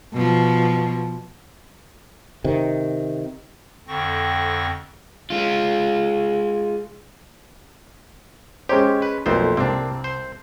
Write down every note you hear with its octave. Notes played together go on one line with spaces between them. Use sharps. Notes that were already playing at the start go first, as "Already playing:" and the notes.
B2 F3
C3 D#3
F2 D3 C4 C#6 A#6
G#3 F4
G#3 C#4 G4 C5 C#5
B4
B1 F2 A3 A#3 C5
C2 A#3 C4 D4
C5